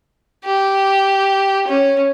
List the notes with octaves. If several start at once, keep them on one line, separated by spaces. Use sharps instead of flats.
G4
C#4